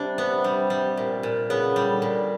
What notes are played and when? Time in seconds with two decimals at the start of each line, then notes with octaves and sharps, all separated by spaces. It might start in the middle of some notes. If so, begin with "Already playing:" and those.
Already playing: C3 G3 D4
0.18 B3
0.44 G3
0.70 G3
0.97 A#2
1.23 A#2
1.49 C#3 B3
1.76 G3
1.90 D3
2.02 A#2